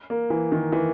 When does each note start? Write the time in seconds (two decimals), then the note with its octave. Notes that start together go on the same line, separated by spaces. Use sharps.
0.10 A#3
0.30 E3
0.52 D#3
0.72 E3